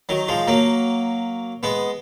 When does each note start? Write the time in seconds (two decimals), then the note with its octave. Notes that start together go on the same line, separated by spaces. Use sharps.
0.09 D#3 F#3
0.28 F3 G#3
0.48 F#3 A#3
1.63 G#3 B3